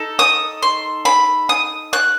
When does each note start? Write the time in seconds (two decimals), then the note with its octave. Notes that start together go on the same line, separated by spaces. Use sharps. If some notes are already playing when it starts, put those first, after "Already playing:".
Already playing: D#4 A4
0.19 D#6
0.62 C6
1.05 B5
1.49 D#6
1.93 F#6